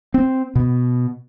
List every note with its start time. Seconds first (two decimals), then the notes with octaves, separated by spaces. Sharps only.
0.14 C4
0.56 B2